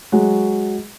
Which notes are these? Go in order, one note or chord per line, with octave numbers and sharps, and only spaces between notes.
F#3 G#3 F#4